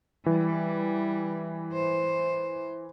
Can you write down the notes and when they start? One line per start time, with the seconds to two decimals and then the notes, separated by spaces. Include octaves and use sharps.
0.26 E3 G3
1.73 C5